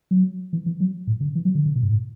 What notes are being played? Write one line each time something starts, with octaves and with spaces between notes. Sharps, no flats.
F#3
E3
E3
F#3
A2
C#3
E3
F#3
D3
C#3
B2
G2
A2